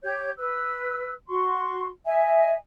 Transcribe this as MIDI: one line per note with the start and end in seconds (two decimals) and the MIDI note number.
0.03 0.29 67
0.03 0.29 73
0.03 0.29 91
0.37 1.11 71
0.37 1.11 88
1.28 1.85 66
1.28 1.85 84
1.28 1.85 85
2.06 2.53 75
2.06 2.53 76
2.06 2.53 80